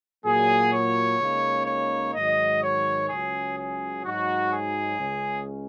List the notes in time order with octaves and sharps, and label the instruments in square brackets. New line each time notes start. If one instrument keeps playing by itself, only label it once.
[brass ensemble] A#2 F#3 A#3 G#4
C#5
C#2 C#3 A#3 D#4
C#5
G#2 D#3 F#3 D#5
C#5
C#2 C#3 F#3 C#4 G#4
G#4
G#2 F#3 D#4 F#4
G#4
C#2 C#3 G#3 C#4